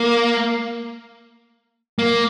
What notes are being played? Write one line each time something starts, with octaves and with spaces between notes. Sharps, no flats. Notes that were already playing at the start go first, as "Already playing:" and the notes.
Already playing: A#3
A#3